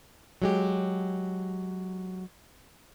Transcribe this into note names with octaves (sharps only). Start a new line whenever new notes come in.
F#3 G#3 G4